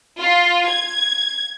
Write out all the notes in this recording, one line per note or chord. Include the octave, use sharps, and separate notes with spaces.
F4
G#6